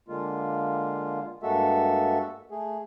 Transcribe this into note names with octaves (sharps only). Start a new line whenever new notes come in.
D3 G#3 A#3 F4
G2 G#3 A#3 F#4 A4 E5
A3 G#4